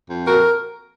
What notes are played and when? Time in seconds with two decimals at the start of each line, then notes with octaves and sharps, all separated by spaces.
0.10 F2
0.25 A#2 F#4 A#4